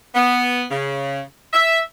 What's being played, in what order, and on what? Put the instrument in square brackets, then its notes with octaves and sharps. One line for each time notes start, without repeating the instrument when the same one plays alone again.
[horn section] B3
C#3
E5